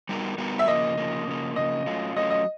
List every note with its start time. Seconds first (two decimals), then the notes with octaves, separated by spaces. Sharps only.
0.09 G3 B3 D#4 F#4 A#4
0.38 G3 B3 D#4 F#4 A#4
0.59 E5
0.68 C#3 F3 A#3 D#5
0.97 C#3 F3 A#3
1.27 C#3 F3 A#3
1.56 C#3 F3 A#3 D#5
1.86 F#3 A3 C#4 F4
2.16 F#3 A3 C#4 F4 D#5
2.30 D#5